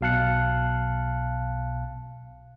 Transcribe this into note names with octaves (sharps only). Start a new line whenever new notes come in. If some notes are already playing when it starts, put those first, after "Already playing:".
B1 B2 F5 A5 F#6 C#7